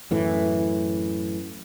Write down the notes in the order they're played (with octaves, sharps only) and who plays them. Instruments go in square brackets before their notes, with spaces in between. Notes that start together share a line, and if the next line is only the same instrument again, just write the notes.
[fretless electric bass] F#2 A2 E3